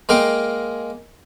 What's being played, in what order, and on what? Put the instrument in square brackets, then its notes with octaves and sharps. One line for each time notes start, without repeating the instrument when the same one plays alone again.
[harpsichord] G#3 A#3 F5 G5